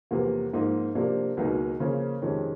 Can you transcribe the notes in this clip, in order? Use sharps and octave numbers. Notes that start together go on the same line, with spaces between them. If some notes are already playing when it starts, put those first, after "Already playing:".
E2 C3 F3 A#3
G#2 F3 A#3 D#4
C3 F3 A#3 D4
C#2 B2 F#3 A#3 D#4
C#3 F3 A#3 C#4
F2 C3 D#3 G#3 C#4